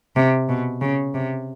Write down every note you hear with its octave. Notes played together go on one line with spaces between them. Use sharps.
C3
B2
C#3
C3